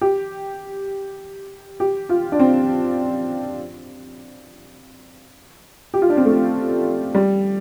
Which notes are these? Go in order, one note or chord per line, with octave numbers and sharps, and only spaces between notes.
G4
G4
F4
D4
C4
G4
F4
D4
C4
A3
G3